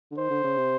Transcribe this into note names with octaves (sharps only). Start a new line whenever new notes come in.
D3
D#3 C5
D3
C#3
C3